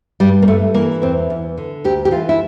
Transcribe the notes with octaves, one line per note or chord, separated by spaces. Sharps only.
G2 G3
A#3
G2 A3
E3 A#3
E2 C4
E2
D3
D2 G4
G4
E3 F4
E4